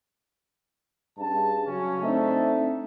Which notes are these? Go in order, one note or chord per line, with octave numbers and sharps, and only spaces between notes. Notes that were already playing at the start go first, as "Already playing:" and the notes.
G2 C#4 G#4 A5
C#3 F#3 C#4
A3 C4 D4 D#4 A4 E5